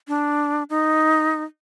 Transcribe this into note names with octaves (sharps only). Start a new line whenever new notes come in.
D4
D#4